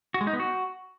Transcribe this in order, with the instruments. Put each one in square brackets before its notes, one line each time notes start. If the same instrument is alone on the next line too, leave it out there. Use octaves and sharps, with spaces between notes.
[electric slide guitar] F#4
G#3
D#4
B3
F#4